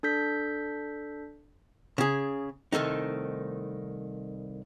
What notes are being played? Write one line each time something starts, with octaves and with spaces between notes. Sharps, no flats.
D4 A4 G6 B6
C#3 G#4
C2 D#3 A3 D#4